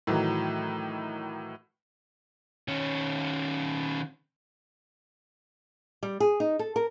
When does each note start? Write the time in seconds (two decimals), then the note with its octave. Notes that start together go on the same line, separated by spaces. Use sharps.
0.07 A2 D#3 E3 F#3
2.68 D#3 C#4
6.03 G3
6.20 G#4
6.40 D#4
6.59 A4
6.76 A#4